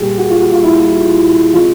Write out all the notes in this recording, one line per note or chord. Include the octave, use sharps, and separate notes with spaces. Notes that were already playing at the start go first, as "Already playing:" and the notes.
Already playing: A#2 G3 A#3 G4 G#4
F#4
F4
F#4
F4
E4
C3 F3 G#3 F4